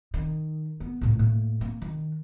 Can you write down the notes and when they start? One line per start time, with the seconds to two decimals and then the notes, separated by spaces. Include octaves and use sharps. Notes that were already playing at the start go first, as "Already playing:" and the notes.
0.14 D#3
0.80 B3
1.01 C#2 A2
1.19 A2 A#3
1.61 A#3
1.82 D#3